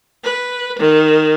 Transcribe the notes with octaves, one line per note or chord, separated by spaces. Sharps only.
B4
D#3